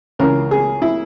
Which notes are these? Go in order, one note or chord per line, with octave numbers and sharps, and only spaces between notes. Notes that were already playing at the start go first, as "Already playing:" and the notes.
C#2 C#3 E3 A#4
G#4
E4